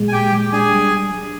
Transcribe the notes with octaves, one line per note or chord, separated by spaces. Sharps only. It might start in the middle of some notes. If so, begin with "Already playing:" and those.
Already playing: A#2 G#3
G#5
A#2 G4 G5
G#3
D4 G#4 G#5
G3
D4
G3